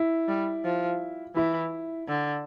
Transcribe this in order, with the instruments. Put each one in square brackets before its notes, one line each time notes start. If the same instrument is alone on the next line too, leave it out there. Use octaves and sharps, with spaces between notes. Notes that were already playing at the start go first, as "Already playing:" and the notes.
Already playing: [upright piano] E4
[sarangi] G3
F3
[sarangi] E3 [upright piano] E4
[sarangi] D3